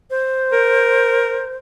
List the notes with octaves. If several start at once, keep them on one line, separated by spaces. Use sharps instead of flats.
C5
A#4